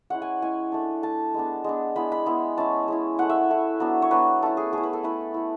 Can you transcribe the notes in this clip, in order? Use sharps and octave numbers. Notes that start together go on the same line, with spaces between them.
G#3 C#4 E4 F#5
G#5
G#3 C#4 E4 G#5
A3 D4
A3 D4 A5
G#3 B3 D4
G#3 B3 D4
G#3 B3 E4 B5
B5
G#3 B3 E4
G#3 C#4 E4 A5
G#3 C#4 E4
A3 E4 F#5
E5
A3 E4
F#3 B3 D4
C#5
F#3 B3 D4 B4
A3 C#4 E4 A4
G#4
A3 C#4 E4 G#4
B4
A4
A3 E4 B4
A3 E4